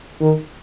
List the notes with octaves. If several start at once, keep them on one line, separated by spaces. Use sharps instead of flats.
D#3